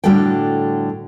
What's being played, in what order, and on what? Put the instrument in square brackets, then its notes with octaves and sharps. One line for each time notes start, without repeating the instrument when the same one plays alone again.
[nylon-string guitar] A2 D3 G3 F#4 A4 G5